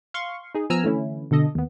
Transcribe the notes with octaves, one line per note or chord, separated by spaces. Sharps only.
F5 C6 C#6
D#4 G#4
F3 B3 G#5 A#5 E6 F6
D3 E3 A3 C#4 E4
B2 D3 A4 D#5
D#2 B3